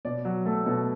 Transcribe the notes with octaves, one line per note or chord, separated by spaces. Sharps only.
B2 D5
F#3 F#5
A3 A4
B2 A4